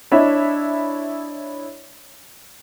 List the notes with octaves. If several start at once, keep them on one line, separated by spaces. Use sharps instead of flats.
D4 E4 C#5 D#5 E5